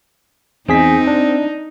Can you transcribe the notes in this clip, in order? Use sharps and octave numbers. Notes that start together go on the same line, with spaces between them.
E2 C4 D#4 G#4 B6
D4